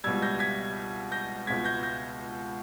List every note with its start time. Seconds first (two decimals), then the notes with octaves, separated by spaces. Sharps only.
0.04 C#2 B2 G3 E6 G#6
0.22 G6 A#6
0.39 G#6 B6
1.12 G6 A#6
1.47 C#2 B2 G#3 G#6 B6
1.64 G6 A#6
1.83 G6 A#6